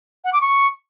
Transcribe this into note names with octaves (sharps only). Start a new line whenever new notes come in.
F#5
D6
C#6